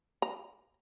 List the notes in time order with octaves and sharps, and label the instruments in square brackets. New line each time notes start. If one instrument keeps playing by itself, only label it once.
[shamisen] A#5